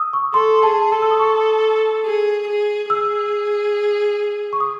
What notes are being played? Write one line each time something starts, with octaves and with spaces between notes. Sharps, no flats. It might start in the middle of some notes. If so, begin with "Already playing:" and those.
Already playing: D#6 E6
C#6
A4 C6
G#4 A5
A4 A5
E6
D#6
C#6
G#4
G#4
G#4 E6
C#6
D#6